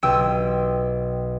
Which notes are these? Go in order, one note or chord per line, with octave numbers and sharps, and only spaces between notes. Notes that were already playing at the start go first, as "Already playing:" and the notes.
B1 G4 G5 E6 D7 D#7